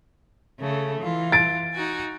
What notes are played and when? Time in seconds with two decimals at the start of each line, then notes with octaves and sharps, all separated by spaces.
0.59 C#3 A3 A4
1.01 E3 F4
1.32 A6 D7
1.73 D#4 F#4 G#5